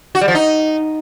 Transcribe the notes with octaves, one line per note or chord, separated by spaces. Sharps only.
F#4
G3
F3
D#4